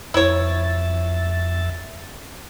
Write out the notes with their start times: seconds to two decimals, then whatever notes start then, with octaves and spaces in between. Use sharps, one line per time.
0.14 F2 E4 C#5 E5 A6